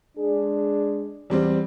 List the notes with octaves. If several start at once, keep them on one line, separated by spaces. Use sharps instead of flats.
G#3 D4 G#4
E2 G3 C4